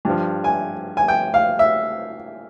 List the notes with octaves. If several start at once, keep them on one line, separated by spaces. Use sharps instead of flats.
G2 F3
G#5
G#5
G5
F5
E5